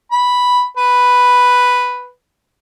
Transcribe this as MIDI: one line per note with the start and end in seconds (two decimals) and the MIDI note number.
0.12 0.65 83
0.77 2.08 71